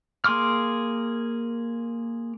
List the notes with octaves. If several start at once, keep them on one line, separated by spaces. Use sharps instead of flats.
A#3 G#4 C6 D6 F6